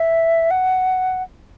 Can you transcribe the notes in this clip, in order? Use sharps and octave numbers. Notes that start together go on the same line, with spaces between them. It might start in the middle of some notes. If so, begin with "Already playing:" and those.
Already playing: E5
F#5